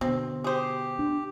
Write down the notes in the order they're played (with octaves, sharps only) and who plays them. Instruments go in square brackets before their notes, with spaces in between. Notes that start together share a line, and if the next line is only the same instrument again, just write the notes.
[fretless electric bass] B2 D3 [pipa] C4
[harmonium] G4 [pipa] G#4 C5
[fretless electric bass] D4